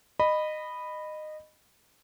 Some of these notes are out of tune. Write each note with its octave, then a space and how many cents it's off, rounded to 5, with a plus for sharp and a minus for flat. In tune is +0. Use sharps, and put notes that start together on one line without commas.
D#5 -20 B5 +0